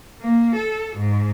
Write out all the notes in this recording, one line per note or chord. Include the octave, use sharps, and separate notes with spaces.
A#3
A4
G#2